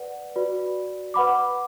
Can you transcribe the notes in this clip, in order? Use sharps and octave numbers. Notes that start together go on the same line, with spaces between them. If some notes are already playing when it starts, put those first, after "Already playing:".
Already playing: B4 D5 F#5
F#4 B4 D5
B4 F#5 B5 D6